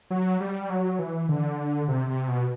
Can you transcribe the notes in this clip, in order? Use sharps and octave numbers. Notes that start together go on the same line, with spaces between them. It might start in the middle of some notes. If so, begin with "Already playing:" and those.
F#3
G3
F#3
E3
D3
C3
C3
B2